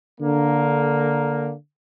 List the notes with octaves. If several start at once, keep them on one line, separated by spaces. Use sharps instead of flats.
D3 A#3